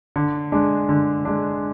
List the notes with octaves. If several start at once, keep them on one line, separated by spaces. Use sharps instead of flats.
D3
G#3 D4
D3
G#3 D4